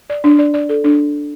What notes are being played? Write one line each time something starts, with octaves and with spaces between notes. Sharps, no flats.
D5
D4
D5
D5
A4
D4